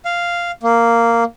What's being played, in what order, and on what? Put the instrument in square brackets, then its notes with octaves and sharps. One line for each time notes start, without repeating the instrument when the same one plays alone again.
[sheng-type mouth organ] F5
A#3